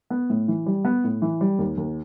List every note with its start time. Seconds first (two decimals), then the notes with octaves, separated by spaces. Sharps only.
0.10 B3
0.30 A2
0.48 E3
0.66 G3
0.85 B3
1.04 A2
1.22 E3
1.41 G3
1.59 D#2
1.77 D#2